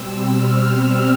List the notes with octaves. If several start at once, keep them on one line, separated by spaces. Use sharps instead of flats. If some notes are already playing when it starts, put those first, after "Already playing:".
Already playing: B2 G3 C4 E6
F6